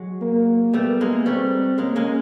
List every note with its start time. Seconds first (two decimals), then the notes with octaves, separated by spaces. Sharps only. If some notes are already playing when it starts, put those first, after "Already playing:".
Already playing: F#3 G#3
0.21 A#3
0.73 G3 A3 B3
1.01 G#3 A#3
1.26 G3 A3 C4
1.78 G#3 A#3 C#4
1.96 G#3 A#3